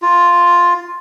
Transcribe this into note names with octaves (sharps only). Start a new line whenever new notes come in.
F4